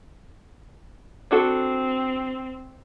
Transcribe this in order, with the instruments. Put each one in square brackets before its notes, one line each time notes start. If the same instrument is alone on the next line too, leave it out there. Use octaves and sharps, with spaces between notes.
[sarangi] C4 [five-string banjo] D4 F#4 A4